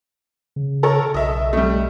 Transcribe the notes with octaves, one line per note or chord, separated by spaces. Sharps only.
C#3
A4 A#4 C#5
B1 D#5 E5
G3 A3